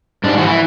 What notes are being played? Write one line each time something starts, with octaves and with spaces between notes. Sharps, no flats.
G#2 D4
F#4
E3
E4